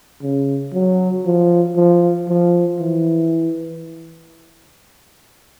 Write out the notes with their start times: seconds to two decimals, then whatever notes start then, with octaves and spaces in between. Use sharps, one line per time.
0.23 C#3
0.74 F#3
1.26 F3
1.76 F3
2.29 F3
2.80 E3